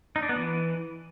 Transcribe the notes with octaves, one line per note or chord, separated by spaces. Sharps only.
D#4
D4
B3
E3